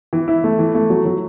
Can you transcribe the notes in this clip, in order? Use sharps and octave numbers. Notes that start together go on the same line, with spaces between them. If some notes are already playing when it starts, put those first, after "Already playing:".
E3
E4
A3
E3
A3
F#3
F#3